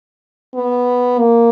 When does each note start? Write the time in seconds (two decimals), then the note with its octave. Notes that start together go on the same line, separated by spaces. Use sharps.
0.55 B3
1.19 A#3